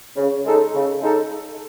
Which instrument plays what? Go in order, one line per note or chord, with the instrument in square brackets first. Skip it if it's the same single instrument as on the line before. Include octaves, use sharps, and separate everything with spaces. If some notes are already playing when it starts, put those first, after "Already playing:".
[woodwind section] C#3
G#3 D#4 A4
C#3
G#3 D#4 A4